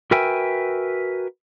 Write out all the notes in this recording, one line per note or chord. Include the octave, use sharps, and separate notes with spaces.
F#4 A#4 B4 E5 G5 G#5